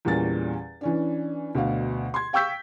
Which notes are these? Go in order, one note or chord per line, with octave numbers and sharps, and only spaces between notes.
E2 A#2 G3 C#4 A6
E3 C#4 D4
D2 B2 D3 F5
C6 G#6
F5 G5 C#6 E6 G6 B6